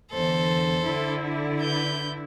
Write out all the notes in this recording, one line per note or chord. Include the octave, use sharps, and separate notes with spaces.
E2 D3 A4 C5
D3 E4
B4 G6